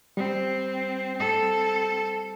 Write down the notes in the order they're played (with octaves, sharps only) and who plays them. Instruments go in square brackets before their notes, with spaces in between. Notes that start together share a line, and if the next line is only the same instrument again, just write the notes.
[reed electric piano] G3 [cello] C4
[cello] C4 A4